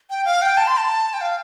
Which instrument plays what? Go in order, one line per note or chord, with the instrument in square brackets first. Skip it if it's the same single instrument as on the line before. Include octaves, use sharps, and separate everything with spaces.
[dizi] G5
F5
G5
A5
C6
A5
G5
F5